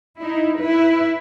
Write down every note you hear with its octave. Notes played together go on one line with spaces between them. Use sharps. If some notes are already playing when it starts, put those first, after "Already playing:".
D#4 E4
E4 B4